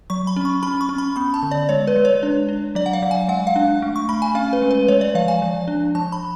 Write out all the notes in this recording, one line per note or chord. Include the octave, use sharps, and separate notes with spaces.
F#3 C#6
B5
C#4
C#6
C#4 B5
C#6
C#4
B5
B3 B5
A5
D3
D5
G#3 C#5
B4
G#3
C#5
D4
D4
F#3 D5
F#5
F5
F#3
G#5
G#3 F#5
F5
D4
A3
C#6
A3 B5
G#5
C#4 F5
B4
G#3
B4
G#3 C#5
D5
F3 F5
G#5
F3
D4
F3 A5
B5